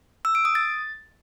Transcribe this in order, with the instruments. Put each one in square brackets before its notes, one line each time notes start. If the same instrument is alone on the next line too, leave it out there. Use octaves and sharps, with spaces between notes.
[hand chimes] E6
D7
D#6
A6